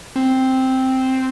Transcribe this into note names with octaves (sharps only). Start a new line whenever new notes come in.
C4